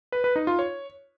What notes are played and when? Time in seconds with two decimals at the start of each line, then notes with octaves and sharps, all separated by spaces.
0.12 B4
0.24 B4
0.36 D#4
0.47 F4
0.59 C#5